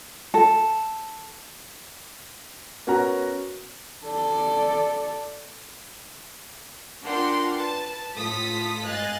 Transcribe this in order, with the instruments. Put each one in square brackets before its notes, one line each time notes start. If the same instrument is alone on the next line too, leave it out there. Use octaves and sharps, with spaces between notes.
[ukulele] A4
[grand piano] B3 C#4 F#4 A#4 A#5
[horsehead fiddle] A4 D5
[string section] D4 F4 A#4 F#5 G5 C6
B4 A5
A2 F4 A4 D#6 B6
G#2 D#5 F5 G#5 F#6 A6